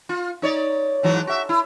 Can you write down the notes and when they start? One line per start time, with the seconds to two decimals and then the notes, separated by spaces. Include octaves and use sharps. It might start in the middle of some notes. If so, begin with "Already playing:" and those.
0.09 F4
0.42 D#4 C#5 D5
1.03 G#2 E3 F#3
1.27 F#4 E5
1.49 E4